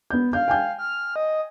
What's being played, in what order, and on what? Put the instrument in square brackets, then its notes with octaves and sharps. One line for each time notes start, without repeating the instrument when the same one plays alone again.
[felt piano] B3 G6
[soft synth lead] F5 [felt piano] G6
[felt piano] G5 G#5 G6
[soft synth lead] F6
D#5